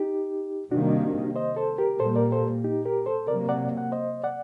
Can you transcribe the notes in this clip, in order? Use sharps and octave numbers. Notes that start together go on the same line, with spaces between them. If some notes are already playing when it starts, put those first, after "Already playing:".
Already playing: D#4 G4
C3 D#3 G3 A#3 D4 F#4
C5 D#5
A4 C5
G4 A#4
A#2 G3 A#3 A4 C5
A#4 D5
A4 C5
D#4 G4
G4 A#4
A4 C5
C3 F#3 A#3 A#4 D5
D5 F#5
F#5
C5 D#5
D5 F#5